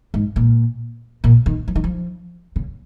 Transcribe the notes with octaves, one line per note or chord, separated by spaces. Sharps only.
G#2
A#2
A#2
D#3
F3
D#3
F3
C#3